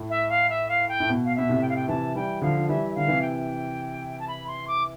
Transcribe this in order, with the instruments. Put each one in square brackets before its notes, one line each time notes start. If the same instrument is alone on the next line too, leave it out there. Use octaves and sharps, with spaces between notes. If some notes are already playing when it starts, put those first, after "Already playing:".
Already playing: [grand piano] A2
[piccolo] E5
F5
E5
F5
G5
[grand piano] A2
B2
[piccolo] F5
[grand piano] B2 [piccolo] E5
[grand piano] A2 C3
[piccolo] G5
F5
G5
[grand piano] C3 E3 [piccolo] A5
[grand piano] E3 G3 [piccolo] G5
[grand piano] D3 F3 [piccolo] F5
[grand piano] F3
[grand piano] E3 G3 [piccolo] E5
[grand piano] D3 [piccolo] F5
[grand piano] C3 E3
[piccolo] G5
A5
B5
C6
D6